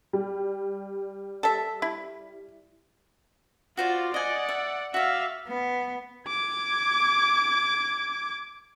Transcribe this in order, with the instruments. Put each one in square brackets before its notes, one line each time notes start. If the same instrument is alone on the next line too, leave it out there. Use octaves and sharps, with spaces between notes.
[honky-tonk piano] G3
[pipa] A4 E5
E4
[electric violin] F4 [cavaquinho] F#4 C5 D5
[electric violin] D5 F#5 [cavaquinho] D#5 G#5
[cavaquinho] E5
[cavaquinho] F#4 D5 [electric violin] E5 F5
[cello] B3
[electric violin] D6 G#6